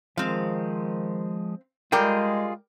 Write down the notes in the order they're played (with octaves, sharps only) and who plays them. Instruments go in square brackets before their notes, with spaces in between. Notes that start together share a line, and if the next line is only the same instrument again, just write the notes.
[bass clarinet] D#3 [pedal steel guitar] F3 G#3 [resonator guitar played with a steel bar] C4 F5
[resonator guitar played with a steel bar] G3 A#4 G5 [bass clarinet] G#3 [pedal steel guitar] F4 G#4